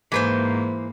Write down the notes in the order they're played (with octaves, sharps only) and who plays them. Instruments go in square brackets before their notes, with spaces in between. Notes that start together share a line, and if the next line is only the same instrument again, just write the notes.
[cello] G#2 A#3 [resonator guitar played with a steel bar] E3 B4 C5